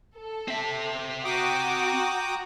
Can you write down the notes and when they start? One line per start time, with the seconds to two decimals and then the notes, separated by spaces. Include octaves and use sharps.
0.17 A4
0.48 C4 E5
1.25 F#4 G5 A#5 D6 D#6